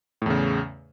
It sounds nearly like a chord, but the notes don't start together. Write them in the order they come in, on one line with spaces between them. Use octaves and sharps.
A2 E2 C#3